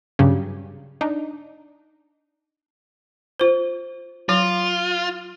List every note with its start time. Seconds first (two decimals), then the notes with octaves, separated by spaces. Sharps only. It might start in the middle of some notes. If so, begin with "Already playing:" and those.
0.19 G2 C#3 F#3 G4
1.01 D4 D#4
3.40 F4 C5
4.29 F#3 F4